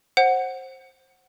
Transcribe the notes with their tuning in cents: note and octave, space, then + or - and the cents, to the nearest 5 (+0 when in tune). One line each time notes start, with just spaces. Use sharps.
C5 +20 F#5 +0